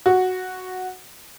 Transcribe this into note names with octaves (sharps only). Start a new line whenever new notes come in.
F#4